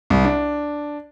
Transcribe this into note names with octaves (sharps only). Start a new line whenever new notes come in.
C2
D4